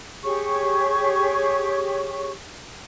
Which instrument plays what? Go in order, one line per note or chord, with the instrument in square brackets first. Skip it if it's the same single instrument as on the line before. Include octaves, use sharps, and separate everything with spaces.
[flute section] G4 G#4 C#5 C#6